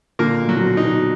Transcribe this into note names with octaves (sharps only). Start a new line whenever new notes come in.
A#2 D3 A#3
B2
F#3
A#2
B2
D#4
B2